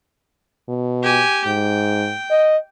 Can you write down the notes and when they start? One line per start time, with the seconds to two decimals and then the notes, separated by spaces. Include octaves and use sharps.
0.69 B2
1.03 G4 G#5
1.46 G#2 G5
2.30 D#5